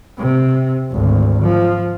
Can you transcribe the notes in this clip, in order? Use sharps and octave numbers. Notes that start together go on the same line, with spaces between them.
C3
G#1 D2
F3